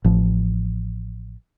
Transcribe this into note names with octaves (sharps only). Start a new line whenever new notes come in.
A1 F3